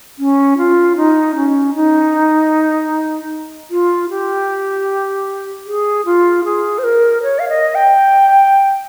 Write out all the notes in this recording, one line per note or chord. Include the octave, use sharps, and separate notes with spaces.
C#4
F4
D#4
C#4
D#4
F4
G4
G#4
F4
G#4
C5
A#4
C#5
F5
D#5
G5